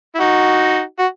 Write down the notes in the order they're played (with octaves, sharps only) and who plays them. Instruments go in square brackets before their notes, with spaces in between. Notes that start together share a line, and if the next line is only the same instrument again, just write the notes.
[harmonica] E4
D#4 F#4
F#4